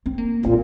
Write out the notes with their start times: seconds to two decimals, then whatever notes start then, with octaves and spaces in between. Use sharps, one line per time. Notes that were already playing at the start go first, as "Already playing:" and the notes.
0.06 C4
0.18 A#3
0.46 A#2 C4